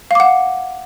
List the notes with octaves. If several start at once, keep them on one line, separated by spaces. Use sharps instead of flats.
F5 F#5 D6